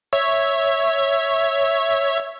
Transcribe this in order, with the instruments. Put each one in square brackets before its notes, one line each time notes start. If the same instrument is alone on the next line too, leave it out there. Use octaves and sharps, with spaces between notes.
[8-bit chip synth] C#5 E5